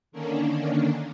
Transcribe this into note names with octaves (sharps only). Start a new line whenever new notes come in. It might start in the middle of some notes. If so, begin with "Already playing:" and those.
D3 D#3 A#3 C#4 D4